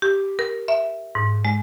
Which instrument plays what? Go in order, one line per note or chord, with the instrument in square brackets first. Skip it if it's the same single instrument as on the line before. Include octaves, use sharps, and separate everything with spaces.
[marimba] G4
A#4
E5
G#2
G#3